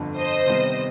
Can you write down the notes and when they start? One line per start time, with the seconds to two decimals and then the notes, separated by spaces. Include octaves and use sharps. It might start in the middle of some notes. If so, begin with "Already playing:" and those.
Already playing: G1 F2 D3
0.18 C5 D#5
0.46 C3 D#3 G3 B3